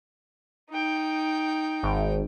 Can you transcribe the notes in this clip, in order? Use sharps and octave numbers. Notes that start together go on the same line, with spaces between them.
D#4 G5
G#1